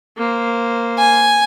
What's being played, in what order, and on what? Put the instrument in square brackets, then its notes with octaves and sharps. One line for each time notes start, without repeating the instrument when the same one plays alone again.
[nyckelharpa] A#3 C5
[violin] G#5